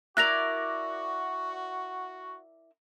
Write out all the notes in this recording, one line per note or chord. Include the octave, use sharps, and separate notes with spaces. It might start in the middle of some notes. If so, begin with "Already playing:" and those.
E4 F#4 A#4 D5 F#6 A#6 F7